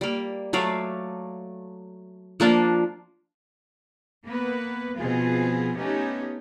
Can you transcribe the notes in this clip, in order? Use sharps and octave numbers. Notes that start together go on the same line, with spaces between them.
G3 A#3
F#3 A3 D5 F5
F3 A#3 D4 F4
A#3 B3 B4
B2 F3 C4 F4 G#4
A3 B3 C#4 D#4 G4